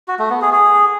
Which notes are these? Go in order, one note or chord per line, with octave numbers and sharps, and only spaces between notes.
F#4
A3
B3
G#4
G#4